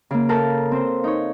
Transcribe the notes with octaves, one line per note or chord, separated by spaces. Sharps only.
C#3 A#3
A4 A#4 F5 A5 A#5
C4 C5
D#4 C#5